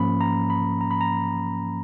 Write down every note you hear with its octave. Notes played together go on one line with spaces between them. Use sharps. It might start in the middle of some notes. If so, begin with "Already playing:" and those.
Already playing: G#2 F3 A#3 C#4 B5
A#5
B5
A#5
B5
A#5